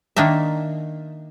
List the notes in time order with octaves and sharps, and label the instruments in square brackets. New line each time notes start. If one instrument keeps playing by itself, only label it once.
[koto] D#3 A#3 D4 D#4 E5